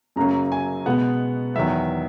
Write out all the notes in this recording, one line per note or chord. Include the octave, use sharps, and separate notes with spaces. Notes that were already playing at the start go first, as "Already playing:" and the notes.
F#2 C#3 F#3 A#3 A#5
G#5
B2 G#3 B3 F#5
E2 D#3 F#3 B3 E5